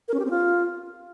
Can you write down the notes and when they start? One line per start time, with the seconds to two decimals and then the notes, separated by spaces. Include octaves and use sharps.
0.08 A#4
0.14 C#4
0.19 G4
0.25 C4
0.30 F4